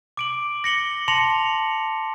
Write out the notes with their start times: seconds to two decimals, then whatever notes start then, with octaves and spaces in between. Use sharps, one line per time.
0.17 D6 D7 F#7
0.64 A#6 C#7 F#7 G7
1.08 A5 C6 A#6 C#7 F7 F#7